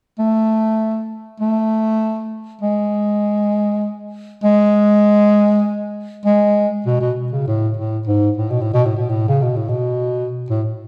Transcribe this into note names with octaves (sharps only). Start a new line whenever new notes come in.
A3
A3
G#3
G#3
G#3
B2
B2
C#3
A2
A2
G#2
A2
B2
A2
B2
A2
B2
A2
C#3
B2
A2
B2
A2